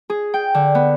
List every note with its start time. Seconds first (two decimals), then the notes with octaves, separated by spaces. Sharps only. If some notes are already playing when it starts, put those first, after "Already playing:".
0.10 G#4
0.34 G5
0.54 D3
0.75 B3